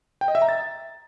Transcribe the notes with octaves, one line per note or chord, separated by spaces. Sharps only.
G5
D#5
E5
A#5
A6